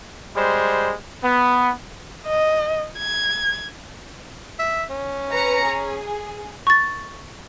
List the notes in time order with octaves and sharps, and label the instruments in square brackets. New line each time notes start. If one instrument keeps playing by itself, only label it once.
[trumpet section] G3 G#3 C5
B3
[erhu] D#5
G#6
[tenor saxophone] E5
C#4
[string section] B4 A#5 C#7
G#4
[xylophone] C#6 A6